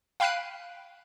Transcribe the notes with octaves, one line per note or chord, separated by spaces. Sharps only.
F5 G5 B5 F#6 C7 D#7